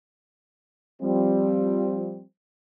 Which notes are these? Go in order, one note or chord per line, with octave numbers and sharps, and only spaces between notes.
F3 G3 C4